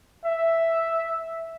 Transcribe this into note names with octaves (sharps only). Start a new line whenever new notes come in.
E5